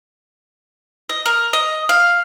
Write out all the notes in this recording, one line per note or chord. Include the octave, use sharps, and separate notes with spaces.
D#5
A#4
D#5
F5